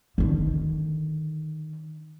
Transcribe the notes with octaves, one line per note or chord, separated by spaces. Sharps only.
D3 D#3